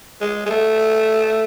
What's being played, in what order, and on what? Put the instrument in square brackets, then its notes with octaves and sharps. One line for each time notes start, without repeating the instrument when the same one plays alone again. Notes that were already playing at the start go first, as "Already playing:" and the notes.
[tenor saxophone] G#3
G#3
A3